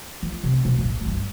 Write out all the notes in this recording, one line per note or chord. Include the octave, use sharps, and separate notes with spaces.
F3
C3
B2
G#2
A2
F#2
G2